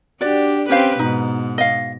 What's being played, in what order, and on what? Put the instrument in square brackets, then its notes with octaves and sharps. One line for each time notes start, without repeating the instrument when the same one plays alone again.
[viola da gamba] D4 G4 [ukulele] F#4 D5
[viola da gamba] C4 G4 B4 [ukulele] C#4 C5 F5
[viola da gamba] G#2 B2 [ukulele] D#4
[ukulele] D#5 F5